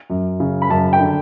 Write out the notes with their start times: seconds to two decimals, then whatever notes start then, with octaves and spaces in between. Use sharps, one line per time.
0.10 F#2
0.40 C#3
0.62 B5
0.70 F#2 A5
0.93 G5
1.00 D3